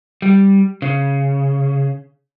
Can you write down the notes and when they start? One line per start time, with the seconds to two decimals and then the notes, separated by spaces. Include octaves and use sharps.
0.22 G3
0.82 C#3